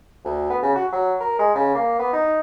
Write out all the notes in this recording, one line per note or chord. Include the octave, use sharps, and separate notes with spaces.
D2
B3
C#3
F#4
F#3
A#4
G#3
C#3
A#3
B3
D#4